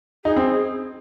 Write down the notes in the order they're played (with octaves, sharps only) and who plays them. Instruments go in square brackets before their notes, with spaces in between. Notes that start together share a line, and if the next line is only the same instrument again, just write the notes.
[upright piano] D#4 [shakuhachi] G#4
[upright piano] C4